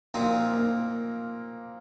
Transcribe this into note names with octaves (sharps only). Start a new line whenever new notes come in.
A#2 F3 A#3 C4 D#4
A#3